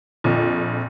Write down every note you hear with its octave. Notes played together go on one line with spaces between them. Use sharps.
A#1 F2